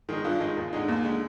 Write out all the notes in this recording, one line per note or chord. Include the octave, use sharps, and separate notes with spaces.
D#3 G#3 D#4
G2 F4
D#3 G#3 D#4
D#2
D3 G#3 D#4
D#2 A#3
D3 G#3 D#4